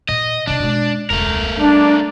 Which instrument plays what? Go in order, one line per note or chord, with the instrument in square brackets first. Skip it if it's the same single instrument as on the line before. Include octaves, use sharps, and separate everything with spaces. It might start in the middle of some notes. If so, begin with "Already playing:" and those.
[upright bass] A#2 [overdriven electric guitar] D#5
[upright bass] C3 D#4 [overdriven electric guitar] D4
[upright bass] B2 G#3
[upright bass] E1 C#2 [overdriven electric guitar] A3 A#4
[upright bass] G3 [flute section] D4